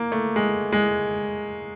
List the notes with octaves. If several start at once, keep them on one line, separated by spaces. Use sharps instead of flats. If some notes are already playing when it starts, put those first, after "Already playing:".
Already playing: A#3
A3
G#3
G#3